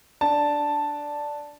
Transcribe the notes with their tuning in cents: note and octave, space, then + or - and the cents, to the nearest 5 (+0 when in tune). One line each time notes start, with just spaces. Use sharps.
D4 +0 A5 +0